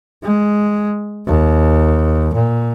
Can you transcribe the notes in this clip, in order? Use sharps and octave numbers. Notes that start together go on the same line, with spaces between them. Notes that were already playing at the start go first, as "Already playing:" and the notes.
G#3
D#2
A#2